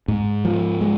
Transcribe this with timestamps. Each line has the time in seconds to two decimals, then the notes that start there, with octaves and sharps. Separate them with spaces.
0.08 G#2
0.45 F3
0.81 G#3